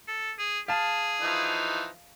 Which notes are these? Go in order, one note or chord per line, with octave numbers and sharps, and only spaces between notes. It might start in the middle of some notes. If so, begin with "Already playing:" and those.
A4
G#4
G#4 F5 A5
E3 F3 D#4